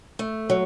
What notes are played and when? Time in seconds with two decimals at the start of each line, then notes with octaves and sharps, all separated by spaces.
0.19 A3
0.50 F#3